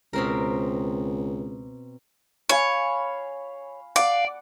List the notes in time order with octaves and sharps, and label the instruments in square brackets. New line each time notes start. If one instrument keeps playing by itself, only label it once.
[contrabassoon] C#2 [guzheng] B2 C4 A#4
[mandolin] C#5 [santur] F5 G#5 B5
[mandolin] D5 [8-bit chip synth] F5 [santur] F#5 D6